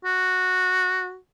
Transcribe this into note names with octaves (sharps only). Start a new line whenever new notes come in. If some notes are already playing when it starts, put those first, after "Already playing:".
F#4